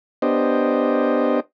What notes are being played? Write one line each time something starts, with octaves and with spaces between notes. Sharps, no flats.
B3 D4 G4 C5 D#5